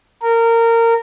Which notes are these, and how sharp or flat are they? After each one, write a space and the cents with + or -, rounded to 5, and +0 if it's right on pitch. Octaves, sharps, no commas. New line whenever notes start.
A#4 -20